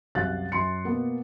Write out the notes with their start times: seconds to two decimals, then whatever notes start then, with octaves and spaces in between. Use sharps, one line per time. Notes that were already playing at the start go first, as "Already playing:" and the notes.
0.15 C2 F#2 F#4 F5 F#6 A6
0.52 F#2 C6 C#7
0.84 B2 A#3 B3